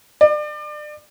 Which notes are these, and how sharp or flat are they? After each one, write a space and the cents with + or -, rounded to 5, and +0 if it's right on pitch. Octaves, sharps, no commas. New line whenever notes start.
D5 +30